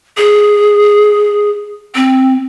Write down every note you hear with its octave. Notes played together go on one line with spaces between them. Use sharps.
G#4
C4